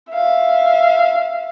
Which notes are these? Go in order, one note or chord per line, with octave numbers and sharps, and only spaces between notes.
E5 F5